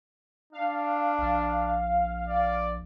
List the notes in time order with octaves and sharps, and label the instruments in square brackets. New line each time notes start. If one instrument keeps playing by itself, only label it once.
[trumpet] D4 [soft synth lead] F5
[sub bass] A#1
[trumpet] D5